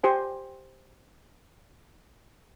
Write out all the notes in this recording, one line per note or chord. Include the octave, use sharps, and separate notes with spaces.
G4 C5 G#5